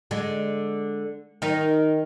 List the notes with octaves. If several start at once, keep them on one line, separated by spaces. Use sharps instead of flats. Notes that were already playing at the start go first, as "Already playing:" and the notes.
D3 G#3
D#3 D#4